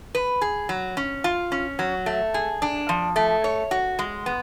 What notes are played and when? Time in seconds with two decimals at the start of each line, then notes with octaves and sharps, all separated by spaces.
0.15 B4
0.41 G#4
0.69 F#3
0.97 C#4
1.24 F4
1.52 C#4
1.79 F#3
2.06 A3
2.34 G#4
2.62 D4
2.89 F3
3.16 A3
3.44 C#5
3.71 F#4
3.99 G#3
4.26 B3